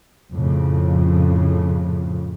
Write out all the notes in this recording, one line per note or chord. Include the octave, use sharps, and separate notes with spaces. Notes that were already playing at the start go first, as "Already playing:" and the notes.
F2 A2 C#3